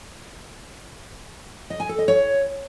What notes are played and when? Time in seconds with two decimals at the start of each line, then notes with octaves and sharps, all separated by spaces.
1.70 D#5
1.80 G#5
1.89 A4
1.99 D#5
2.08 C#5